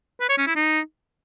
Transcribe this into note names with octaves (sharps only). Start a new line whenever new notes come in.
B4
C#5
C#4
E4
D#4